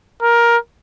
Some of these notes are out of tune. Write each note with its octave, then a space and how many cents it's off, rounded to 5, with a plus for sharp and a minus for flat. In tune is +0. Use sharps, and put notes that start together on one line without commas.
A#4 +15